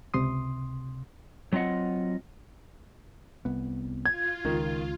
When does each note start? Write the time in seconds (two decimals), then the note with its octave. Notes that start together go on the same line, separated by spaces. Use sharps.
0.14 C#2 C3 C6 D#6
1.53 F#3 C4 F4 D#5 F#5
3.45 C2 B3
4.06 F4 G#6
4.45 C#2 D#3